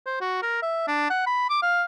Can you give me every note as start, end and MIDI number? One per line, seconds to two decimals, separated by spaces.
0.06 0.20 72
0.21 0.42 66
0.42 0.61 70
0.62 0.84 76
0.88 1.09 62
1.10 1.22 78
1.26 1.49 83
1.50 1.58 86
1.62 1.84 77